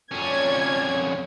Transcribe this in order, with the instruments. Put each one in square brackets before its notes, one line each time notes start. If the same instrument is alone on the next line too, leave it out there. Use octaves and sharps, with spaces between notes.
[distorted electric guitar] F2 C#4 [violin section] C#5 D5 G#6